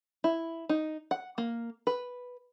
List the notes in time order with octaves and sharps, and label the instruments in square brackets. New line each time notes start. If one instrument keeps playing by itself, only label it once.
[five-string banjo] E4
D#4
F#5
A#3
B4